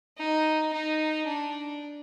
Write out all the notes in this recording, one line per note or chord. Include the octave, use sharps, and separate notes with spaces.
D#4
D#4
D4